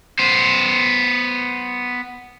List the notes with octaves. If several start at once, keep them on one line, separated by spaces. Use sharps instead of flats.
B3 C5